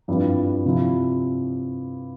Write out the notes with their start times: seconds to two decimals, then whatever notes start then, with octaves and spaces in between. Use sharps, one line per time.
0.08 G2 F3 C4 E4
0.65 C3 F3 C4 E4